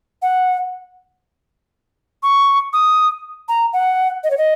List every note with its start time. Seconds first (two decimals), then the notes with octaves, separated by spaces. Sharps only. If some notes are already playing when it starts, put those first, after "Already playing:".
0.22 F#5
2.23 C#6
2.73 D#6
3.48 A#5
3.73 F#5
4.24 D#5
4.30 C#5
4.37 D#5